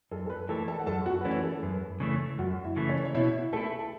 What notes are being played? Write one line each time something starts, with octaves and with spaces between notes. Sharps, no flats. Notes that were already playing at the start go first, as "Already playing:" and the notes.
F#2 A4
A4
B4
E3 A3 A4 A5
A4 A5
F#5
F#2 A4 A5
F#4 F#5
B4
E3 A3 C#4 C#5
A4
F#2 B4
C#3 E3 A3 C#4 C#5
F#2 F#4 F#5
E4 E5
C#3 E3 A3
C#4 C#5
C#5
B2 E4 E5
A3 E4 A4 A5
A5